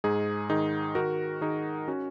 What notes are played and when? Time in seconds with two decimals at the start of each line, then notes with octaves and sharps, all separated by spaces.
0.04 G#2 D#4 G#4
0.50 D#3 D#4 G#4
0.95 D#3 F#4 A#4
1.41 D#3 D#4 G#4
1.88 C#4 F#4